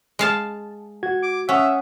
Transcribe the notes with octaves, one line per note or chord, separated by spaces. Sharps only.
G#3 F5 A5
F#4 G#6
D6
C#4 E5 F#5 C#6 D#6